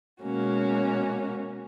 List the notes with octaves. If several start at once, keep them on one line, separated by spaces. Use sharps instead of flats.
B2 G#3 A#3 C#4 F#4